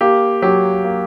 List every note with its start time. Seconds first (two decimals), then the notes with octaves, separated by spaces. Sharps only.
0.01 A#3 G4
0.42 F#3 G4
0.84 A#3